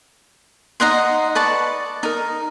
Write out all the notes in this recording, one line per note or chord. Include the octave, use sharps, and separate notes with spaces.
D#4 D#5 F#5 C6
B4 D5 A5 C#6
D#4 A#4